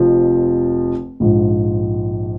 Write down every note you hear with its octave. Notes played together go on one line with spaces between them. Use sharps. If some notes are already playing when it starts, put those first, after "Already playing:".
Already playing: F1 F2 F3
A#1 G#2 F3